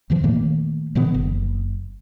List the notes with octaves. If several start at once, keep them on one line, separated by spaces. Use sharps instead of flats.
E2 D#3 F3
A#2 D#3 A3 A#3
A#2 D3 E3 B3
F#1